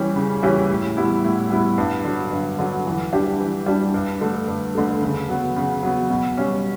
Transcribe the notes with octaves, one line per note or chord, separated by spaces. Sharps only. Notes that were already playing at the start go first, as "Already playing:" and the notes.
Already playing: E3 G3 C#4 G4
C#3
E3 G3 C#4 G4
A2
G3 B3 E4
A2
G3 B3 E4
G2
D3 F#3
G2
D3 F#3
E3
G3 D4 G4
E3
G3 D4 G4
G2
D3 A3
G2
D3 A3
C#3
F#3 B3
C#3
F#3 B3
B2
G3 C#4